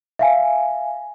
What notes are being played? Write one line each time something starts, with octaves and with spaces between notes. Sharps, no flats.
E5 F5 G#5